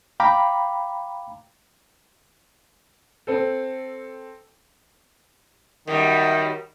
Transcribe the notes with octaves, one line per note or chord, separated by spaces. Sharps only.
F5 G5 A#5 B5 D6
C4 A4
F#2 D#3 G3